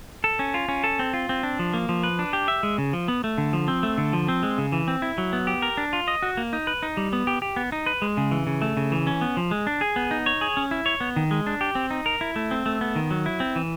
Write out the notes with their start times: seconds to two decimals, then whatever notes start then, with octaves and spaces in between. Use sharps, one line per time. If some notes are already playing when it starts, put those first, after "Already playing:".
0.24 A4
0.39 C#4
0.54 F4
0.68 C#4
0.84 A4
0.99 C4
1.14 F4
1.29 C4
1.43 D4
1.59 F3
1.74 A#3
1.89 F3
2.03 B4
2.19 D4
2.33 G4
2.48 E5
2.63 G#3
2.78 C#3
2.93 F3
3.08 B3
3.24 A3
3.38 D3
3.53 F3
3.68 C4
3.83 A3
3.98 D3
4.13 F3
4.28 C4
4.43 G#3
4.58 C#3
4.72 E3
4.88 C4
5.02 E4
5.18 F#3
5.33 B3
5.47 G4
5.62 A#4
5.77 D4
5.93 F4
6.08 D#5
6.22 F#4
6.37 A#3
6.53 D#4
6.67 B4
6.83 D#4
6.97 G3
7.13 B3
7.27 G4
7.42 G4
7.56 B3
7.72 D#4
7.86 B4
8.02 G#3
8.17 C#3
8.31 E3
8.47 C#3
8.62 A3
8.77 C#3
8.92 E3
9.07 C#4
9.21 B3
9.37 F3
9.51 G#3
9.67 D4
9.81 G#4
9.96 B3
10.11 D#4
10.26 C#5
10.41 G#4
10.57 C#4
10.71 E4
10.86 C#5
11.00 B3
11.16 D#3
11.31 G#3
11.47 D4
11.61 G4
11.75 C4
11.91 D#4
12.06 A#4
12.21 E4
12.36 A3
12.51 C4
12.66 A3
12.81 B3
12.96 D#3
13.11 F#3
13.26 E4
13.40 C4
13.56 E3